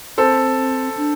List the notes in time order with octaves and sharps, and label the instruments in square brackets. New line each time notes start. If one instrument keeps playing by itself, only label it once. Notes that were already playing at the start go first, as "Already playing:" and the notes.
[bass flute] C4 [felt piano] A4 C5
[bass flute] D4